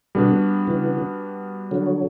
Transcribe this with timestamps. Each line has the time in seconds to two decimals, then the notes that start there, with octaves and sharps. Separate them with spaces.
0.15 B2 D3 G3 B3 D4 F#4
0.67 C#3 E3
1.71 D3 F#3